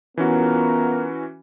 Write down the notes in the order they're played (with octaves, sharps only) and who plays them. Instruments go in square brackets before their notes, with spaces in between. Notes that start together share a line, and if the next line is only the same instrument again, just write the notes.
[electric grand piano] E3 C#4 F#4 [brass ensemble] B3 F4 A#4